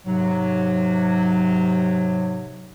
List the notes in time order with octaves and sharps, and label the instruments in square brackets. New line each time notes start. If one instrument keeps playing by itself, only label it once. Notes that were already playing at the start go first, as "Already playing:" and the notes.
[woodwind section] G#2 C3 F#3